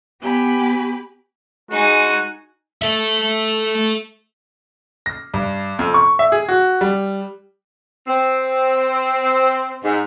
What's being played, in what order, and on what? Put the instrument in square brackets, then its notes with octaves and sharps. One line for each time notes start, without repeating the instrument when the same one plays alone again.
[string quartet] B3 G4 G#5 B5
[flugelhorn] G#3 [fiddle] D#4 G#5 [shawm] F#4
[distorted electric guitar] A4 E5
[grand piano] A#6
G2
F2
C#6
E5
G#4
F#4
G3
[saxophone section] C4
G#2